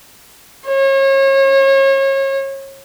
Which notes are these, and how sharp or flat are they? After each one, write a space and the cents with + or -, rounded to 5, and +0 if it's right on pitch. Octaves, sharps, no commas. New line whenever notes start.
C#5 -35